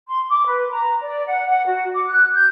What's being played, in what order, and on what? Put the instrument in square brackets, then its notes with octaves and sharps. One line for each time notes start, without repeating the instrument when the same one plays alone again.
[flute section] C6
D6
B4
A#5
D5
F#5
F#5
F#4
D6
F#6
G6